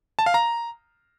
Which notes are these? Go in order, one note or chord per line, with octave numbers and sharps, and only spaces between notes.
A5
F5
A#5